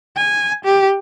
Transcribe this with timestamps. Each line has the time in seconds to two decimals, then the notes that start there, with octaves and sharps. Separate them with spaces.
0.16 G#5
0.64 G4